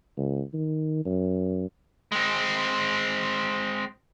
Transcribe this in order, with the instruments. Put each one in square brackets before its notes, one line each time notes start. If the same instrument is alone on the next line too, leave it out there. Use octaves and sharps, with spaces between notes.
[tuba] C#2
D#3
F#2
[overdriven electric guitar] G#3 C4